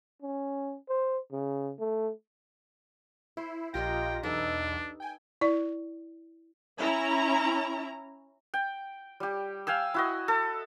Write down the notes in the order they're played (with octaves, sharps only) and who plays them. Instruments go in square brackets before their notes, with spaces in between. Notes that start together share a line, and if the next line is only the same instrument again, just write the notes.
[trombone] C#4
C5
C#3
A3
[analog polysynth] E4 [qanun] C5
[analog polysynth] A#1 F4 A#6 [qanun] G4 A#4 D#5 [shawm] G5
[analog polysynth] B1 E2 [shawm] D4 [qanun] D#4 A4 B4
[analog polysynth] G5 G#5
[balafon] E4 D5
[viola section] C#4 E4 A#5
[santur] G5
G3 G4
F5 G5 G#5 E6
E4 F#4 D#5
A4